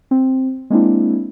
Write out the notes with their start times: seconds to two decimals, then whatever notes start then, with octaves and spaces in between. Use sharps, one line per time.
0.11 C4
0.70 G#3 A#3 C4 D4 E4